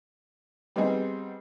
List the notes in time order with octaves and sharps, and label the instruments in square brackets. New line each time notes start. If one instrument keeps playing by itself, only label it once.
[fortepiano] G3 B3 C4 D#4 G#4